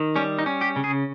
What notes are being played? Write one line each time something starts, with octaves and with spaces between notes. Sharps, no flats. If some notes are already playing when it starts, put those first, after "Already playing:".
Already playing: D#3
G3 C#4
D#4
C#4
G4
C#3
G#4